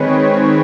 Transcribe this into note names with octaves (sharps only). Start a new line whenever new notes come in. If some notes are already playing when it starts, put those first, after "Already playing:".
Already playing: D#3 G#3 C4 B4 C#5